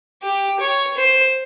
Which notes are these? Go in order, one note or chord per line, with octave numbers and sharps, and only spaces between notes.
G4
C#5
C5